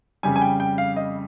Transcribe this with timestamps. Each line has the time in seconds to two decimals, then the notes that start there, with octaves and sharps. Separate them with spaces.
0.23 F2 C#3 G3 G#5
0.36 G#5
0.42 G5
0.60 G5
0.78 F5
0.96 D#5